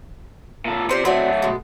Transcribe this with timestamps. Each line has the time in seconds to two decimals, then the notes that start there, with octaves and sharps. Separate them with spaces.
0.65 A#2 A4
0.89 C3 F4 C5 D5
1.05 F#3 A3 C4 F#4 D5
1.42 B2 G#3